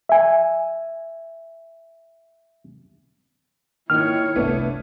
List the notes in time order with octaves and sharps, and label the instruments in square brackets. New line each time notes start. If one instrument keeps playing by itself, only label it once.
[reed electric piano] E5 G#5
[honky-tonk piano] A#2 D#3 [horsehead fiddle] E4 C#5 [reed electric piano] F6
[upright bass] G1 C2 [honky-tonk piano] A3 B3 D4